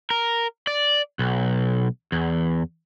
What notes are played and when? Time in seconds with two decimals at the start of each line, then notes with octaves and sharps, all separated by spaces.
0.10 A#4
0.67 D5
1.19 B1
2.12 E2